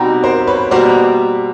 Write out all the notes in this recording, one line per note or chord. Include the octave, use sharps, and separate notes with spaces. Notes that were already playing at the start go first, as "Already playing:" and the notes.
Already playing: B2 G3 C4 D#4
A#4 C5
B4 C#5
B2 G3 A#3 C5 D5